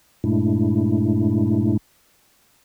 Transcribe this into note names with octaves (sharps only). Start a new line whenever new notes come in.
G2 A#2 G#3 A3 D4 E4